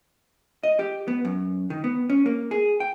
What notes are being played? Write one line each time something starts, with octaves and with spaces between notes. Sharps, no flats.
D#5
G4
B3
F#2
D#3
B3
C#4
A#3
G#4
G5